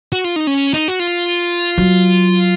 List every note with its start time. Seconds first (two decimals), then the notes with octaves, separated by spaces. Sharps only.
0.12 F#4
0.24 F4
0.36 D#4
0.47 C#4
0.74 D#4
0.88 F#4
1.00 F4
1.78 F#3